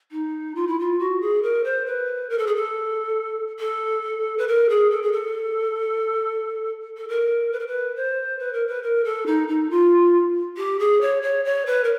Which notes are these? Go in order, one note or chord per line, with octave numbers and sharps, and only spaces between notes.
D#4
F4
E4
F4
F#4
G#4
A#4
C5
B4
A#4
A4
G#4
A4
A4
B4
A#4
G#4
A4
G#4
A4
A4
A#4
B4
A#4
B4
C5
B4
A#4
B4
A#4
A4
D#4
D#4
F4
G4
G#4
C#5
C#5
C#5
B4
A#4